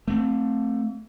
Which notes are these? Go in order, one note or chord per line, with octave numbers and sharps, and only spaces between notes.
A3 C4